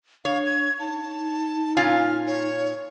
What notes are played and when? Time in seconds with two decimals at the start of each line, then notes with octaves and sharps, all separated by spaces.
0.25 D4 C#5 F5
0.46 G#6
0.80 D#4 A5
1.77 A#2 C#4 F4 F6
2.27 C#5